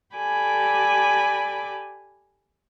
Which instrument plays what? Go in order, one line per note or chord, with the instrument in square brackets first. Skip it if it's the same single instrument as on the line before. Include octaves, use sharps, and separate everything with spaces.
[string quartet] G4 A4 D5 G#5 B5 D6